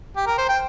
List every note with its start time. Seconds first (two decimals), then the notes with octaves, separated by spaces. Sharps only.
0.16 G4
0.27 A#4
0.38 C5
0.49 G5